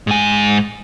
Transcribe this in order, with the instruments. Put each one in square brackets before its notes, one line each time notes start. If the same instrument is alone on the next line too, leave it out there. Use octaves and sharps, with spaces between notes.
[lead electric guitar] G#2 G#5